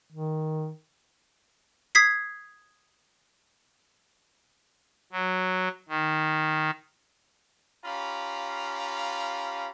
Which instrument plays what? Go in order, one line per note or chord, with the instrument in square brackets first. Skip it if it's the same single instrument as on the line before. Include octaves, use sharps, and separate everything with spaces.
[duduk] D#3
[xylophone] D#6 G#6 B6 C7
[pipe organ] F#3
D#3
[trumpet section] C#4 F4 G4 F5 A#5 B5